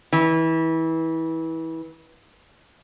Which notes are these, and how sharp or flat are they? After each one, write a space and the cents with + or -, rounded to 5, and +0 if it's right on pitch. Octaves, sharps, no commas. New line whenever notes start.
E3 -25